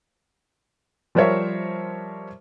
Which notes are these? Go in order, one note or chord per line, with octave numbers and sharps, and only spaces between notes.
F3 G3 A#4 C5 C#5 E5